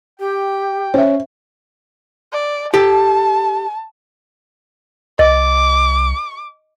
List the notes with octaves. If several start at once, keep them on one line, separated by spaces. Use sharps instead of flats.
G4 G5
C#4 C5 E5
D5
G4 A4 A5
C2 D#5 D6